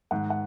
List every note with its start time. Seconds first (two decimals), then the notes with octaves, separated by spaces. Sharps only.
0.11 G#2 D#3 F#5
0.30 F#5